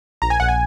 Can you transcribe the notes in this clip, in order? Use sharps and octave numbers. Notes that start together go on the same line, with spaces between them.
A#1 A#5
G#5
A#1 F#5
G#5